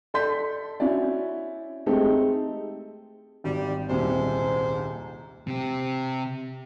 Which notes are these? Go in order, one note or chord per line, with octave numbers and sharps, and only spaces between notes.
A4 D5 C6 G6 B6
C#4 E4 F#4 D5
G#3 A3 C4 D#4 G4 A4
G#1 G3
D#1 C2 G#2 C3 G3 C5
C3 G4